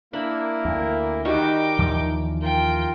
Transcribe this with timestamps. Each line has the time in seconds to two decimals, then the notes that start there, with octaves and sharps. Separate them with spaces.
0.13 A#3 D4 E4 A#4 B5
0.65 D2
1.25 D#3 G3 D#4 F#4 A#4 G5 D6
1.79 D#2 E3 F3
2.42 F4 A#4 G5